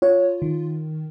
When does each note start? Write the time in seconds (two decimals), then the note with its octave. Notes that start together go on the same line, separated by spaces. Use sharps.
0.02 F4 C#5
0.42 D#3